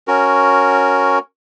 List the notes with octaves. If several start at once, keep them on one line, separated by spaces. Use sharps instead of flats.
C#4 F#4 A#4